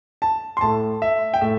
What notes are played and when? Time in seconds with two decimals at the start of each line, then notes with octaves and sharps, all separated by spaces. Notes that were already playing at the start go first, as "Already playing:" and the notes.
0.22 A5
0.57 C6
0.61 A2 A3 A5
1.02 E5
1.34 G5
1.41 A2 A3 E5